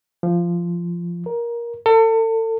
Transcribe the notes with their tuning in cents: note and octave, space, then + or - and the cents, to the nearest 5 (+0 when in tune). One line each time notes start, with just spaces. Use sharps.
F3 -15
A#4 +15
A4 +35